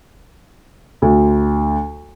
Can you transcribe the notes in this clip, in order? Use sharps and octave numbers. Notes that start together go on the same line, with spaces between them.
D2